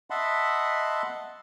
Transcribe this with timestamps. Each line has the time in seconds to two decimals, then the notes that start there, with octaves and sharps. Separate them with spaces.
0.10 D#5 E5 F#5 A5 B5 C6